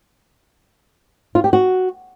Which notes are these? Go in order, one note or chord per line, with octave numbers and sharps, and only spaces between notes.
F4
G4
F#4